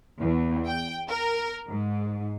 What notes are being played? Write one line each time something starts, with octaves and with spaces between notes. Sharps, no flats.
E2
G5
A#4
G#2